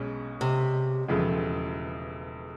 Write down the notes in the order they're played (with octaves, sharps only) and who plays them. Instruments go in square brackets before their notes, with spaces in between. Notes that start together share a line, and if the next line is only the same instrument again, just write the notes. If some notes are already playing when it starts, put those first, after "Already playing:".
Already playing: [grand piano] B1 B2 G#3 C#4
[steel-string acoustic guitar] C3
[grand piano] E1 E2 C#3 F3 A3